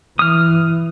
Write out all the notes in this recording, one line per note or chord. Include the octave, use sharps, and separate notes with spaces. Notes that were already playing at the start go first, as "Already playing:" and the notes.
E3 D#6 F6